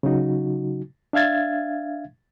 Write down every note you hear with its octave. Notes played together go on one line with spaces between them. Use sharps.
C#3 F#3 D#4 F#4
D4 E5 F5 G#6 A6